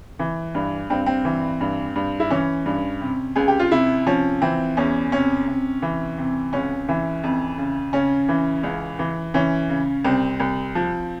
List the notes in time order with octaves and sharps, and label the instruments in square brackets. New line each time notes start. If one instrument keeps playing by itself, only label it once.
[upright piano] E3
G2
G2 C4
C4
E3
G2
G2
E4
E3 C#4
G2
C3
C#2 G#4
G4
F4
C3 E4
F3 C#4
E3 C4
E2 C#4
C3 C#4
C3
E3
C3
C#2 C#4
E3
F2
C#3
C#3 C#4
E3
C#2
E3
E3 C#4
C#3
C2 C4
C2
F3